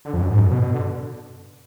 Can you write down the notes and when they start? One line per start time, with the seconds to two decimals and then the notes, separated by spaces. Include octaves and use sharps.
0.05 D3
0.13 F2
0.21 F#2
0.31 G#2
0.39 F#2
0.51 B2
0.62 B2
0.73 D3